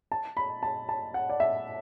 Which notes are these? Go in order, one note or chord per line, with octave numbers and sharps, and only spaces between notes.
A5
B5
A5
A5
F#5
D5
E5